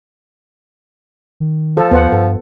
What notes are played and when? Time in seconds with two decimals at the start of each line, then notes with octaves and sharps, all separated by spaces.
1.40 D#3
1.77 F3 A4
1.91 D#2 B3 C5 F#5
2.12 G2 A4